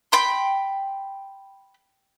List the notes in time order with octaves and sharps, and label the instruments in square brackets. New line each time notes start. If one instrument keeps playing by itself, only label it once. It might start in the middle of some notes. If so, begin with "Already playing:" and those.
[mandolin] G5 B5 C6